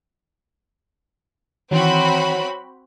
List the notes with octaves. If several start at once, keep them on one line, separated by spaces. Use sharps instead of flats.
D#3 E3 F#3 C4 F#4 B5